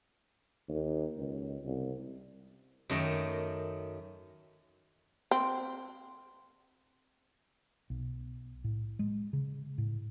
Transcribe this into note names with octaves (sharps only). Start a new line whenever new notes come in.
D#2
C#2
C2
F#2 D#3 A3 D#5 G5
C4
B1
A2
G#3
C#3
A2